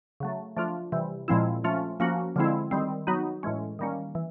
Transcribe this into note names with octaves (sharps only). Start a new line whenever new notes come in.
C#3 F#3 A3
F3 A3 D4 F4
C3 E3 G3
A#2 F3 G#3 C4 E4
F3 A3 C#4 F4
F3 A#3 C#4 F#4
D3 F3 G#3 C4 E4
D#3 G3 C4
F#3 B3 D#4 F#4
A2 E3 G#3 C#4
D#3 G3 A#3 C#4
E3